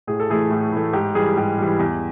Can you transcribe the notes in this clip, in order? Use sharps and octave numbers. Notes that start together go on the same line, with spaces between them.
A2 G#4
A4
E3 A3 G#4
A2
E3 A3
G#2 G4
E3 G3 G#4
G#2 G4
E3 G3
E2